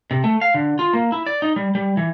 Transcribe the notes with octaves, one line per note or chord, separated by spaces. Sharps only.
C3
A3
F5
D3
F4
A#3
E4
D5
D#4
G3
G3
E3